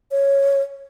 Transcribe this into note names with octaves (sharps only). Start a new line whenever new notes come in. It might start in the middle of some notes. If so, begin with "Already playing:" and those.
C#5